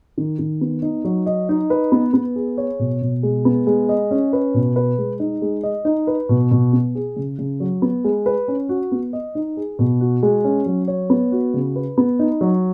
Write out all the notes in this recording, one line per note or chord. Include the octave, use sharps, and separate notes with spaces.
D#3
D#3
B3
D#4
F#3
D#5
D#4
B4
B3
B3
G#4
C#5
B2
B2
G#3
B3
G#3
D#5
C#4
B4
B2
B4
G#3
D#4
G#3
D#5
D#4
B4
B2
B2
B3
G#4
C#3
C#3
F#3
B3
G#3
B4
C#4
F#4
B3
D#5
D#4
G#4
B2
F#4
G#3
C#4
F#3
C#5
B3
F#4
C#3
B4
B3
D#4
F#3